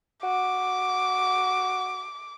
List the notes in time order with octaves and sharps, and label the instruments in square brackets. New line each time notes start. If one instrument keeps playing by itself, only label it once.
[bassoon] F#4 [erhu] D6